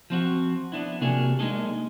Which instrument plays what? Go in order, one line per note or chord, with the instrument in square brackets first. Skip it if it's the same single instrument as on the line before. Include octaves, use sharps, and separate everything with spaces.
[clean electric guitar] F3 C4 F#4
B3 D4 E4
C3 A#3 D4 F#4 G#4
G#3 A#3 D4 D#4 G#4 A4